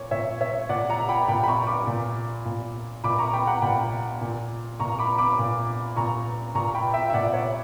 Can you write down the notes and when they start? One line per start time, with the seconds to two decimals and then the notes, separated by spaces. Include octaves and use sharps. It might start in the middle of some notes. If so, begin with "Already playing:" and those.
Already playing: A#2 C#5
0.11 A#2 C#5 E5
0.41 C#5 E5
0.69 A#2 D5 F#5
0.89 F#5 A#5
1.09 G5 B5
1.28 A#2 G5 B5
1.44 B5
1.48 A#5 C#6
1.67 B5 D6
1.87 A#2
2.45 A#2
3.04 A#2 B5 D6
3.19 A#5 C#6
3.33 G5 B5
3.47 F#5 A#5
3.62 A#2 G5 B5
4.21 A#2
4.80 A#2 A#5 C#6
4.99 B5 D6
5.18 B5 D6
5.39 A#2
5.96 A#2 A#5 C#6
6.55 A#2 A#5 C#6
6.74 G5 B5
6.94 E5 G5
7.10 E5
7.13 A#2 D5 F#5
7.33 C#5 E5